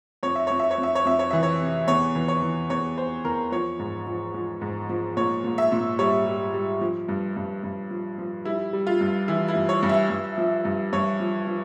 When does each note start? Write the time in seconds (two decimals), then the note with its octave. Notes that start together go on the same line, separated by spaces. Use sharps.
0.23 F2 C#5
0.35 E5
0.47 F2 C#5
0.59 E5
0.71 C#5
0.78 F2
0.83 E5
0.95 C#5
1.05 F2 E5
1.19 C#5
1.31 E3 E5
1.43 C#5
1.60 C3
1.87 E2 C#5
2.15 E3
2.28 C#5
2.42 E3
2.70 E2 C#5
2.98 E2 C5
3.25 E2 A#4
3.52 F3 C#5
3.79 G#2
4.07 F3
4.34 F3
4.61 G#2
4.89 F3
5.17 A#2 C#5
5.44 A#2
5.58 E5
5.72 A#2
5.99 G3 C#5
6.26 G3
6.54 G3
6.81 F3
7.08 G2
7.36 G2
7.63 G2
7.91 F3
8.18 F3
8.45 G3 E4
8.73 G3
8.87 F4
9.01 G2
9.28 E3 E4
9.48 E4
9.56 G2
9.69 C#5
9.83 G2
9.89 E5
10.10 G2
10.38 F3
10.65 G2
10.93 G2 C#5
11.20 F3
11.47 F3